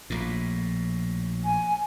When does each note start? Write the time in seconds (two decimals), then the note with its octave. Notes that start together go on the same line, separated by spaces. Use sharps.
0.10 A#1 A2
1.45 G#5